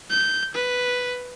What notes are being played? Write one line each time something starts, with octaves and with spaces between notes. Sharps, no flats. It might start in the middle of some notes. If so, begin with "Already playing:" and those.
G6
B4